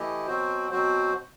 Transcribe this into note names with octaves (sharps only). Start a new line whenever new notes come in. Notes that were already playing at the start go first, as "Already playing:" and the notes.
Already playing: E3 A3 E4 G4 D#5
B2 F#3 C4 F#4 C5
B2 F#3 C4 F#4 C5